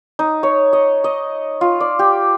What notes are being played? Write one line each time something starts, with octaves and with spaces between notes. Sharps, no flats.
D#4
C#5
D#5
D#5
F4
D5
G4